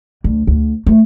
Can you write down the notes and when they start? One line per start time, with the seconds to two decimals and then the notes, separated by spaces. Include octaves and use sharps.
0.24 D2
0.47 D2
0.86 A3